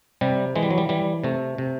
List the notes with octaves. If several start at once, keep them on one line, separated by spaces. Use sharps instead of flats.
C3 G3
E3 G#3
G3
F#3
G3
E3 G3
C3 A3
C3